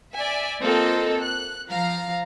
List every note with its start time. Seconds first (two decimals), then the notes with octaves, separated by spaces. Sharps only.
0.13 D5 E5 G#5
0.61 A#3 C4 F4 A4 D#5
1.20 F#6
1.71 F3 F5 A#5